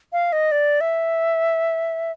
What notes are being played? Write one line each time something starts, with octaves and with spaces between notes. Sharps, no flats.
F5
D#5
D5
E5